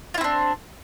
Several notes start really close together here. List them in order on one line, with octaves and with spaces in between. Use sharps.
F4 E4 C4 D4